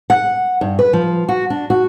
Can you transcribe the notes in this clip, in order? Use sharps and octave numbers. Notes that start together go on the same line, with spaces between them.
F#5
G2
B4
F3
F#4
D4
F#4